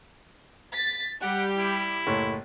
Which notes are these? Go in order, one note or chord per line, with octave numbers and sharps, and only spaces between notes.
A6 B6
G3 G4 F#5
E4
F#1 A2 C#5